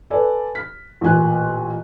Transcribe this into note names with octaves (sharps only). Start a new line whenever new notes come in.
A4 B4 D5 G#5
F6 B6
A1 A#2 G#5 F#6